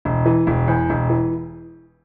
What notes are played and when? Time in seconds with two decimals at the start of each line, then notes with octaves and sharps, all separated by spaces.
0.05 E1
0.26 E3
0.47 E1
0.67 E2
0.90 E1
1.10 E3